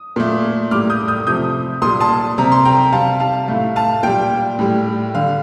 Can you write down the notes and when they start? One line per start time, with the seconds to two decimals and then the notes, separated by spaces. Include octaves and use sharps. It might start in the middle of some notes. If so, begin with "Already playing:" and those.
Already playing: D#6
0.16 A#2 A3
0.71 A2 G3 D6 F6
0.90 D#6 G6
1.08 D#6 G6
1.27 C3 F3 A3 D#6 G6
1.82 A#2 G3 C6 D#6
2.00 A5 C6
2.38 C3 G3 A#5
2.52 C6
2.65 G5 A#5
2.93 C3 G3 F5 A5
3.20 F5 A5
3.48 A2 A3 F5
3.76 F5 A5
4.03 A#2 G3 G5
4.59 A2 G3
5.14 D3 G3 F5